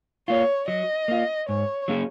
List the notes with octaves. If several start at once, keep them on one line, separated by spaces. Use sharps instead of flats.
A#3 F4 C#5
F#3 D#5
A#3 F4
G#2 C#5
F#3 A#3 C#4 G#4